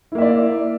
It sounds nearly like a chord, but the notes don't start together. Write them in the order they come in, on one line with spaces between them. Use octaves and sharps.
E4 A#3 E5 D5